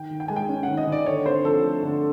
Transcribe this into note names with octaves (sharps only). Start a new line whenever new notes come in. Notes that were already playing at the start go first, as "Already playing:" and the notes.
Already playing: D#3 G5
D#3
G5
G#3 G#5
G5
C#4
D#3 F#5
D#5
D#3 D5
D3 C#5
C4 C5
F3 A4
A3
D3